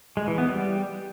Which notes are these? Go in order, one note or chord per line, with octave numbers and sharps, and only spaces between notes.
G#3
E3
B3
G3